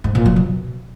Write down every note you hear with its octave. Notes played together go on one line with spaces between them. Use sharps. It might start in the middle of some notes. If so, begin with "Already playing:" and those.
G#2
A#2
F#3
B2